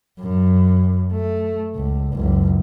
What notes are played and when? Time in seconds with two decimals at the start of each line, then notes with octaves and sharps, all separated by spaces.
0.20 F#2
1.13 A3
1.76 C#2
2.13 F#1 C#2